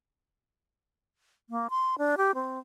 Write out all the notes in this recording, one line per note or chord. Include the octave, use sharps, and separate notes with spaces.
A#3
C6
D4
G4
C4